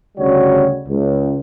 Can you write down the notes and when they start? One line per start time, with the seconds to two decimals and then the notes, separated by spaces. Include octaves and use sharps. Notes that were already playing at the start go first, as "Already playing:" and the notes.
0.18 D2 C#3 G3 F#4 C#5
0.88 C#2